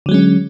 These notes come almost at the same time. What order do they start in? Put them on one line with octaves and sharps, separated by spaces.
D3 F#3 G#3 C#4